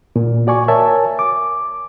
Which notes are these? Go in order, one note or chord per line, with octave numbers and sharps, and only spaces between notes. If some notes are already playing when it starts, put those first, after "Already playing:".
A#2
F#4 D5 G#5 C#6
A#4 C#5 E5 G#5 A5
D6